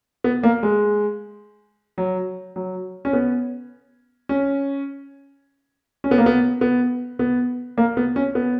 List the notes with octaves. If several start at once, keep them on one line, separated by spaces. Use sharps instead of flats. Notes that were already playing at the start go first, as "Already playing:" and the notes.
B3
A#3
G#3
F#3
F#3
C#4
B3
C#4
C#4
B3
A#3
B3
B3
B3
A#3
B3
C#4
B3